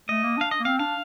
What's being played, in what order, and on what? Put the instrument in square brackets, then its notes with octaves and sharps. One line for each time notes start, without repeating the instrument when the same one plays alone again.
[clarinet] A3 [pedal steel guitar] D#5
[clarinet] A#3
[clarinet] D4 [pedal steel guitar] F5
[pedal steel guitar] D#5
[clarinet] A#3
[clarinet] C4 [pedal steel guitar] F5
[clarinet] D4 [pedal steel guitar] F5